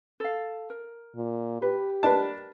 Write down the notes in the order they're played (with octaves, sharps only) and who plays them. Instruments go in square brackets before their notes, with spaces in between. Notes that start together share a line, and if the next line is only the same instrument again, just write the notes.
[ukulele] A4 F5
A#4
[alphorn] A#2
[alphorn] G4 [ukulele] B4
[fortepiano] D4 A5 [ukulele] A#4 B4